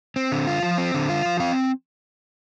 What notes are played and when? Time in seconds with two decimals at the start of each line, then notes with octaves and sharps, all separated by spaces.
0.16 C4
0.32 D3
0.47 F4
0.63 F3
0.78 C4
0.94 D3
1.09 F4
1.25 F3
1.40 C4 F5